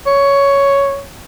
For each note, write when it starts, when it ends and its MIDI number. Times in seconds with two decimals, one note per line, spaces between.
0.06 1.02 73